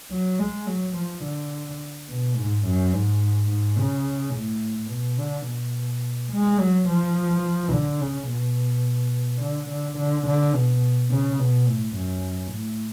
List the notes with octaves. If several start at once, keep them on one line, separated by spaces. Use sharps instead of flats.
F#3
G#3
F#3
F3
D3
B2
G#2
F#2
G#2
G#2
C#3
A2
B2
D3
B2
G#3
F#3
F3
D3
C#3
B2
D3
D3
D3
D3
B2
C#3
B2
A2
F#2
A2